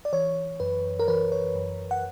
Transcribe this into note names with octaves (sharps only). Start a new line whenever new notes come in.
D5
E3 C#5
F#2 B4
A#4
E3 B4
C#5
F#2
F#5